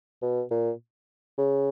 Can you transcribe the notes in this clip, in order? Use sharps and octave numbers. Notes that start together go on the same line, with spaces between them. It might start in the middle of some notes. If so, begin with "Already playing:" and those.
B2
A#2
C#3